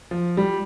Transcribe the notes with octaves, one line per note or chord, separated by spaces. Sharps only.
F3
G3